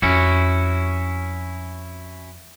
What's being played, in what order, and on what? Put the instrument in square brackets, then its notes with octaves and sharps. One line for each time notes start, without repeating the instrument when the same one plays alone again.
[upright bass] F2 [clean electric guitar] C#4 E4 F#4